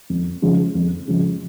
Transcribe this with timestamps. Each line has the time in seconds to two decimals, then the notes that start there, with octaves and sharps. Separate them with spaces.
0.10 F2
0.42 C#3 F3 G#3
0.75 F2
1.08 C#3 F3 G#3